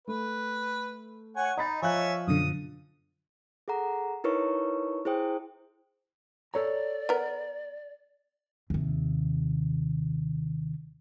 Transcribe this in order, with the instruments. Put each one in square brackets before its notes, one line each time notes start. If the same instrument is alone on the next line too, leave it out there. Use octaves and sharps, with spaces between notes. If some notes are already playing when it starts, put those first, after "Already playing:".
[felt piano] A3 [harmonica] B4
[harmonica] C#5 F#5 G#5
[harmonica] D#4 [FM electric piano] D#5 [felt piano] A#5 B5 A6
[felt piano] F3 F5 F#6 [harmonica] C#5 E5 G#5
[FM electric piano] F#2 B2 D3 [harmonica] D#6
[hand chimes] G#4 A4 F#5 A#5
D#4 E4 A#4 B4 C#5 C#6
E4 G#4 C5 G5 D#6
[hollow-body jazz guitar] A4 C#5 A#5 [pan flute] D5
[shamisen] B3 A#4
[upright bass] D#2 C3